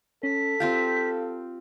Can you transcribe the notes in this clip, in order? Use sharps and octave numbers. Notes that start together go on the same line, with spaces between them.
C#4 A4 B6
C4 F4 G4 F5